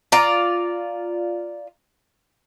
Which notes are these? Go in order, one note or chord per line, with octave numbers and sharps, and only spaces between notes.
F4 D5 A#5